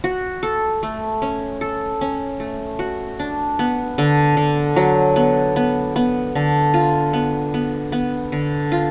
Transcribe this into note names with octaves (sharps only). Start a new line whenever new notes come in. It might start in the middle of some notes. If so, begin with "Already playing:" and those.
F#4
A4
A3
C#4
A4
C#4
A3
F#4
D4
B3
D3
D3
F#3
B3
B3
B3
D3
F4
B3
B3
B3
D3
F4